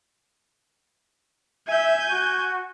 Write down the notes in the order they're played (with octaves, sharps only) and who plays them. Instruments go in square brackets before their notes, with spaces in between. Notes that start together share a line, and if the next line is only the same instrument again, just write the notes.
[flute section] E5 [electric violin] G#5 G6
[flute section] F#4